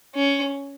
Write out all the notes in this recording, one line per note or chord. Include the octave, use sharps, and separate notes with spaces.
C#4